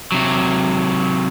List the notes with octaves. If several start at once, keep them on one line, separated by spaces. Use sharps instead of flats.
C3 F#3